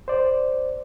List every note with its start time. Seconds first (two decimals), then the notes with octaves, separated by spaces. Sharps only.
0.08 C5 D5